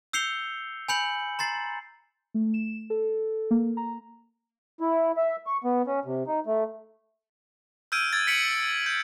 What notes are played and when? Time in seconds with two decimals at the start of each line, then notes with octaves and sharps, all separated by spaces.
0.13 E6 G6 C7 C#7 F7 G7
0.89 G#5 B5 G6 C#7 F#7
1.39 A#5 C6 A6 C7
2.34 A3
2.54 E7
2.90 A4
3.51 A#3
3.77 A#5
4.80 E4
5.17 E5
5.47 C#6
5.64 B3
5.87 C#4
6.05 C3
6.27 D#4
6.46 A3
7.92 E6 F6 G6 G#6 D7 D#7
8.13 E6 G#6 A6
8.27 B6 C#7 D7 F#7
8.86 G6